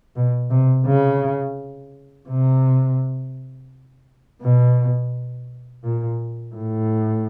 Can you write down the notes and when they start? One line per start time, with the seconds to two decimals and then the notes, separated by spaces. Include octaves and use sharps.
0.16 B2
0.51 C3
0.87 C#3
2.29 C3
4.42 B2
5.84 A#2
6.55 A2